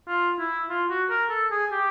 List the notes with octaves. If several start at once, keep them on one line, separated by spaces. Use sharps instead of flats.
F4
E4
F4
F#4
A#4
A4
G#4
G4